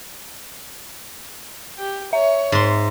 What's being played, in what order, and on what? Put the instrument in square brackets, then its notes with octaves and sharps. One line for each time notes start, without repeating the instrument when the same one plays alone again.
[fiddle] G4
[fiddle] C#5 [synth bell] E5
[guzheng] G#2 C6